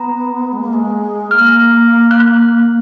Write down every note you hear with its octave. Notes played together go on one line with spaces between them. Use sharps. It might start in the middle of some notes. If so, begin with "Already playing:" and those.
Already playing: B3 A#5
G#3
A#3
G#3
A#3 F6
F#6